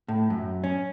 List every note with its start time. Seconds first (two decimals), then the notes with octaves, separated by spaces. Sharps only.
0.08 A2
0.30 F#2
0.64 C#4